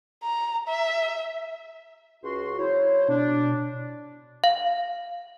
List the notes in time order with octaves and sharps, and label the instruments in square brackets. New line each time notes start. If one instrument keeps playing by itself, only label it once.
[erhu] A#5
E5
[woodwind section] C#2 F#4 C6
[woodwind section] F#3 E4 C5 [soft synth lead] C#5
[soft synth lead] B2 [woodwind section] D4
[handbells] F5